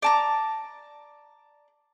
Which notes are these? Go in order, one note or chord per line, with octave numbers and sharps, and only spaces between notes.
D5 A5 A#5